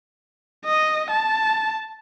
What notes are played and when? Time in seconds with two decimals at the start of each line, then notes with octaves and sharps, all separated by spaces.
0.65 D#5
1.10 A5